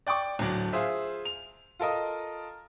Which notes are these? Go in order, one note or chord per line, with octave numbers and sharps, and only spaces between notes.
D5 G5 C#6 D6
D1 F#3 D4
F4 G#4 C5 E5
F7
F4 A4 A#4 D#5